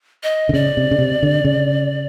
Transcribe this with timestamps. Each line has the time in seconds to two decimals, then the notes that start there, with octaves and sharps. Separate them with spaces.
0.23 D#5
0.49 D3
0.54 C#3 D5
0.77 C3
0.91 C#3
0.99 C3
1.23 D3
1.45 C#3